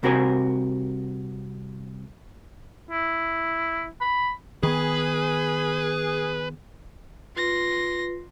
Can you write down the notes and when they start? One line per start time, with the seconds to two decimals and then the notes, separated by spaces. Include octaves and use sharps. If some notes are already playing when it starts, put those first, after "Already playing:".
0.03 C2 C3 F#4 A#4 C5 G#5
2.90 E4
4.01 B5
4.63 D#3 B3 G#4 B4
7.36 F4 B4 C6 A#6